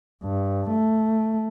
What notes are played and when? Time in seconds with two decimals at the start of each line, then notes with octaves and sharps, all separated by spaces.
0.23 G2
0.70 A3